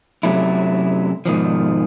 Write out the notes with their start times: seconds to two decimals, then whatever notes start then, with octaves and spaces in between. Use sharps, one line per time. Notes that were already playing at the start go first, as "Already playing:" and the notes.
0.23 F#2 C3 F#3 A3 E4
1.26 G#2 B2 D#3 F3